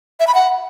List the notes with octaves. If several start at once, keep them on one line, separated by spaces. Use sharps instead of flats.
E5
B5
F#5